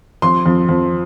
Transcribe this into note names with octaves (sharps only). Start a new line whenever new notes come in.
F2 C6
F2
F2